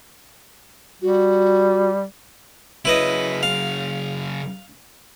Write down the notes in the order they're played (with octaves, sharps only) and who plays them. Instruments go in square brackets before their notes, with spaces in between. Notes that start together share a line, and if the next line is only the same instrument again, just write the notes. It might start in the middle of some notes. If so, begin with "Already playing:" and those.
[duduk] G3 [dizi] F#4
[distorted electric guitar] C#3 F#3 [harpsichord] E4 B4 D#5
[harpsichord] F5